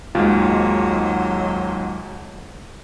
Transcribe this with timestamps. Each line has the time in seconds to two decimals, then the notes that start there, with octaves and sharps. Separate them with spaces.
0.15 D#2 G#2 F#3 G#3 F4